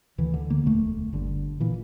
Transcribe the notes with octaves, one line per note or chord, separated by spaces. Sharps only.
D2 D3 E3
D3
A#3
E1 D2 D3 A3
G1 G2 D3
A#2 E3